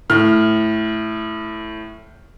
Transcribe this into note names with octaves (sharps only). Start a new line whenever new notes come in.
A2 F6